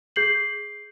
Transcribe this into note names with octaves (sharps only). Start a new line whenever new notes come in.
G#4 G6 C7 F#7